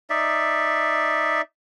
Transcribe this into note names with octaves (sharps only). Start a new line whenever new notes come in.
D#4 D5 E5